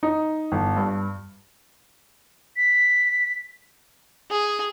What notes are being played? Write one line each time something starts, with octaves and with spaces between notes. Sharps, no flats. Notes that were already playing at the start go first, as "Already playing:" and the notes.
D#4
G1
G2
B6
G#4